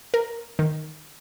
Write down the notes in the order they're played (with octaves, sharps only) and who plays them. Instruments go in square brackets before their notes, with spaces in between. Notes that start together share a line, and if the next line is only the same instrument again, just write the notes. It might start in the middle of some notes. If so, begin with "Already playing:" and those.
[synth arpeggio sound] A#4
D#3